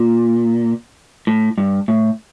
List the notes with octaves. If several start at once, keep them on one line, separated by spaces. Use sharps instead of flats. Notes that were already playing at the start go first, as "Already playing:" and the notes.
Already playing: A#2
A2
G2
A2